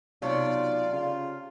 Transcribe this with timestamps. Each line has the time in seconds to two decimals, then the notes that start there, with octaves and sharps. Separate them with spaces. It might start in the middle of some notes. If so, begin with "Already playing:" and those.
0.22 B1 C3 A3 F4 C#5 D5
0.93 C#3 F4